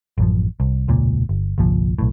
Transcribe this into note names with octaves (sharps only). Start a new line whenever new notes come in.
A1 F#2 F3
C2
E1 C#2 A#2
G1
G1 C2 A#2 F3
B1 A2